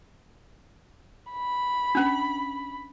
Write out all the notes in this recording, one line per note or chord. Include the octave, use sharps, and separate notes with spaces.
B5
C#4 D4